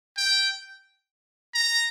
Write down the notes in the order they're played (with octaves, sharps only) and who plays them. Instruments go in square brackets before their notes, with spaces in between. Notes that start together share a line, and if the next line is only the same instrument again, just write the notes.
[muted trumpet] G5
A#5